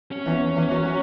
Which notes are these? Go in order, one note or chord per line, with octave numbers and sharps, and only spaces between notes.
C#4
E2 E3
E2 E3
F#2 F#3
F#3